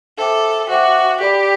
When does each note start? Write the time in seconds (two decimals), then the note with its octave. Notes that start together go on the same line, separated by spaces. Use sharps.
0.18 A4 C5 E5 G5 D6
0.70 F#4 C5 E5 G5 D6
1.20 G4 A4 D5 G5 B5